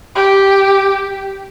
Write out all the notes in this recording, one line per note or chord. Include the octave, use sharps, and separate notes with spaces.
G4